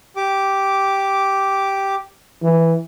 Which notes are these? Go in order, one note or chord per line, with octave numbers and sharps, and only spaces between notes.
G4 D6
E3